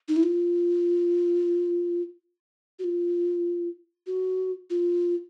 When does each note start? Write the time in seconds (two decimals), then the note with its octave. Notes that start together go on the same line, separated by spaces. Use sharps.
0.08 D#4
0.16 E4
0.23 F4
2.79 F#4
2.84 F4
4.07 F#4
4.70 F4